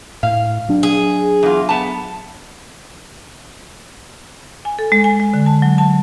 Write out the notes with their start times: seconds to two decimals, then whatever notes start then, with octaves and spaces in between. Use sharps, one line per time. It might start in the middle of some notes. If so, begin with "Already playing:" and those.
0.23 A2 F5
0.69 F#3 D4
0.83 G#4
1.43 E2 F4
1.69 A3 B3 A5
4.65 G#5
4.79 A4
4.92 G#3
5.04 G#5
5.20 G#3
5.34 D3
5.46 A5
5.62 F#3
5.78 A5